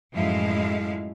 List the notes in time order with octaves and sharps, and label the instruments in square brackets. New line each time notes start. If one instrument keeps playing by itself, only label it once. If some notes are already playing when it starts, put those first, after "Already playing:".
[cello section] F#2 A2 F3 G#3 E4 F5